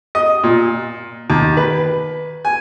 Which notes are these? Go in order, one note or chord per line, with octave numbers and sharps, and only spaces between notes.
D#5
A#2
D#2
B4
G#5